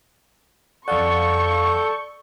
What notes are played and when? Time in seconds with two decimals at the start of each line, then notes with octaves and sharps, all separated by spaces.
0.88 F2 A4 D5 F5 F#5 C#6 G6